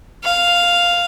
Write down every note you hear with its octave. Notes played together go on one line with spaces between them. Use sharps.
F5